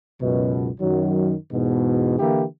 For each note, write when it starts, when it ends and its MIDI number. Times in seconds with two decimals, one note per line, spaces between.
0.21 0.69 37
0.21 0.69 42
0.21 0.69 47
0.80 1.34 42
0.80 1.34 51
0.80 1.34 54
1.52 2.19 40
1.52 2.19 44
1.52 2.19 47
2.19 2.44 50
2.19 2.44 52
2.19 2.44 58
2.19 2.44 64
2.19 2.44 67